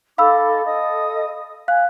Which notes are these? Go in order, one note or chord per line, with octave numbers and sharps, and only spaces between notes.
D#4 A4 F5 B5 D6 E6
A4 D#5 D#6
F5 G#5 F#6